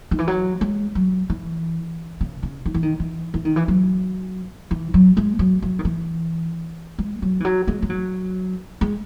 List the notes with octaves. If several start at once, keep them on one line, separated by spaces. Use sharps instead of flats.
D#3
E3
F#3
G#3
F#3
E3
C#3
C#3
D#3
E3
D#3
E3
E3
D#3
E3
F#3
E3
F#3
G#3
F#3
F#3
D#3
E3
G#3
F#3
E3
F#3
G#3
G#3
F#3
G#3